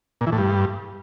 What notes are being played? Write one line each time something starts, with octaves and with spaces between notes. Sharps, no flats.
A#2
E3
A2
G2